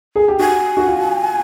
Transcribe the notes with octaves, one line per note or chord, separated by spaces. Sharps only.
G#4
G4
F#4 G#5
F#4
F4